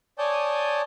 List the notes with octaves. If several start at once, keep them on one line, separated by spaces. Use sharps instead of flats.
C#5 D5 G#5 A5 D#6 G6